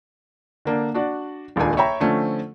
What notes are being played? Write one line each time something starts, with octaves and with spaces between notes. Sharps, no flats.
D3 A#3 D4
D4 F#4 D5
D#1 C#2 D#3 D4 G#5
C#5 E5 G5 A#5 B5
D3 F3 A3 C4 C#4